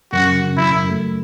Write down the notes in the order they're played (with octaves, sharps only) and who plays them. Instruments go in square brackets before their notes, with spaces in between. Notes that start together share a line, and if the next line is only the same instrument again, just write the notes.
[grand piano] F#2 [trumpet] F#4
[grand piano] C#3
C#3
[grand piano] F#2 [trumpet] E4
[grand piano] F#2
A3